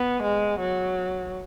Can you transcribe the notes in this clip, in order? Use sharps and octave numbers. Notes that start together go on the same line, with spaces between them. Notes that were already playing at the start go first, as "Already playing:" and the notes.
Already playing: B3
G#3
F#3